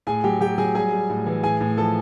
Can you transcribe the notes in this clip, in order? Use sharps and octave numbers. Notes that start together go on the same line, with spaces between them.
A2 G#4 G#5
F#3 G4 G5
F#3 G4 G5
F#3 G#4 G#5
G3 G#4 G#5
G3
A2
E3
A2 G#4 G#5
A2
F3 A4 A5